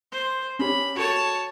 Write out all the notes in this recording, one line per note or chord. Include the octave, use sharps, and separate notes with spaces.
C5
C#4 G4 C#5 B5
F#4 A4 C#5 A5